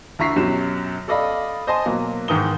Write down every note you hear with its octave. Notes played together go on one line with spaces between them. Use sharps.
D2 E4 A#5 C#6 B6 C7
F#2 B2 F#3 G4 E7
A4 D5 D#5 F5 B5
C5 D#5 G#5 A5 C6
B2 F#3 A#3
G#2 D#3 E3 A#4 D#6 G7